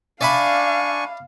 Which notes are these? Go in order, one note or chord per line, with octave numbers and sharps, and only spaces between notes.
D4 D5 E5 F5 G#5 B5 C#6